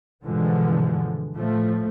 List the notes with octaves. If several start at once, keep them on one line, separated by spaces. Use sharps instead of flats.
G2 B2 D3 E3 F3 G#3
A2 F3 A3